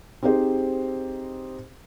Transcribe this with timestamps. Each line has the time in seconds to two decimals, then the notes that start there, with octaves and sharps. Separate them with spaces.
0.23 C4 D#4 G4 G#4 C5